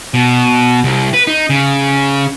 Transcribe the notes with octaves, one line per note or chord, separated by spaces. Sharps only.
B2
C2
B4
D#4
C#3